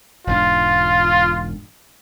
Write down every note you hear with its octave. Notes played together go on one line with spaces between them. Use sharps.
E1 G#2 D4 F4